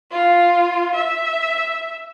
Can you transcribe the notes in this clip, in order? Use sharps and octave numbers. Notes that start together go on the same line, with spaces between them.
F4
E5